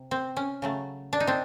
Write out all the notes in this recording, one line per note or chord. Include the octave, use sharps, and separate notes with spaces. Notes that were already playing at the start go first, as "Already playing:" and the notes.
Already playing: C3
C4
C#4
C#3 F#3 A3
D4
D#4
C4 D4